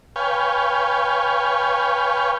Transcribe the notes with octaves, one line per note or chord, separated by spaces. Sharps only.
B4 C#5 F5 G5 G#5